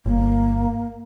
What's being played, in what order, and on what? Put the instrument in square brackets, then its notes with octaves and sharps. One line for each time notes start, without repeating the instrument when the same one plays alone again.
[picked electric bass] G1 [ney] A#3